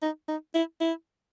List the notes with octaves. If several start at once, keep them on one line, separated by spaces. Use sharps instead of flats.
D#4
D#4
E4
E4